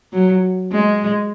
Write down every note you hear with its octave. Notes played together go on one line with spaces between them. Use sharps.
F#3
G#3